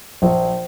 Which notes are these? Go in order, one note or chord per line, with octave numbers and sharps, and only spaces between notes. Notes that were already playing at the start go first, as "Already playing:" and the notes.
A#1 C5